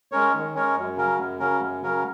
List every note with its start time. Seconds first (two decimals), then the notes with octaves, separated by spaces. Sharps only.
0.12 G#3 C#4 A#4 C#5
0.33 D#3
0.55 G#3 C#4 A#4 C#5
0.76 F#2
0.96 C#3 F#3 C#4 A#4
1.18 F#2
1.39 C#3 F#3 C#4 A#4
1.60 F#2
1.82 C#3 F#3 C#4 A#4